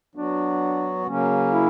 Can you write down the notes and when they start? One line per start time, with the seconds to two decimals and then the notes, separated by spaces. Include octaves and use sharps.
0.15 F#3 B3 D4 F#4
1.06 C#3 F#3 A#3 C#4
1.52 E4